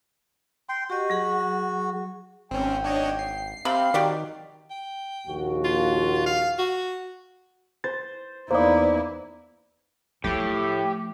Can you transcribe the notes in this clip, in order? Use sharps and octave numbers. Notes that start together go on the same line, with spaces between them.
G5 C6
F#4 G4 D#5
F#3 G#4 F#5
G#1 C4 C#4 G5
D4 C#5 D#5
C7
C3 C4 G4 F5 B5
D#3 F#4 G4 D5
G5
A#1 D#2 F#4
F4
F5
F#4
C5 A6
E2 A#3 D#4 E4 B4 C5 D5
A2 F3 A3 G4